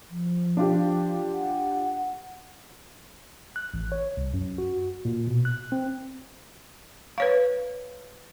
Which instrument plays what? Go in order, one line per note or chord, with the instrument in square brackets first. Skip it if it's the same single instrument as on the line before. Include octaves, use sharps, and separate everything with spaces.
[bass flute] F3
[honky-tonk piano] D4 F4 G4
[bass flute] F#5
[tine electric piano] F#6
A1
C#5
C2
F#2
F#4
A#2
B2
F#6
C4
[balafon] B4 C#5 F5